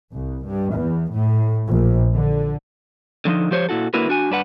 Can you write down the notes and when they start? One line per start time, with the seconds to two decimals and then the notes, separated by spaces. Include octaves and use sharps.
0.12 C2
0.46 G2
0.76 E2
1.12 A2
1.69 A#1
2.15 D3
3.25 D3 F3 B3 D#4
3.51 F3 G4 C5 C#5
3.69 A#2 E4 F#4 A4
3.94 D3 A#3 E4 F#4 A#4 B4
4.09 D4 F#4 G#5
4.31 G2 D4 B4 F#5